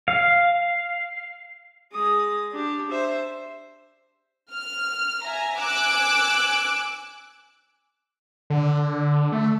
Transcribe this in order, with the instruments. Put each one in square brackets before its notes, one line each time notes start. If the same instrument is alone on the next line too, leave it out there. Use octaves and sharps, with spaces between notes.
[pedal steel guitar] F5
[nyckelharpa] G#3 D#6
D4 G4
C5 E5
[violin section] F6
E5 G#5 A#5
G#5 D6 E6 F#6 D7
[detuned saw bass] D3
A3